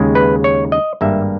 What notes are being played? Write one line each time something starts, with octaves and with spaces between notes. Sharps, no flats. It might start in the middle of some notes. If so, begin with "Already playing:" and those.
Already playing: D#2 C#3 G#3
B4
C#5
D#5
G#1 G2 G3 A#3 E5